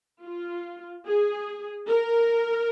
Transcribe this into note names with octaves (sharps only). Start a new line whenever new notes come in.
F4
G#4
A#4